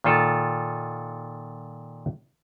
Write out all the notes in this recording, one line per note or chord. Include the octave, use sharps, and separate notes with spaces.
A#2 D#3 F4 A4